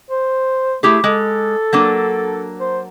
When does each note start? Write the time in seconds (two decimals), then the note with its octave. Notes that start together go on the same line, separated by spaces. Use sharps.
0.10 C5
0.83 A3 E4 G4 G#4
1.04 G#3 A4
1.73 F#3 A#3 D4
2.60 C5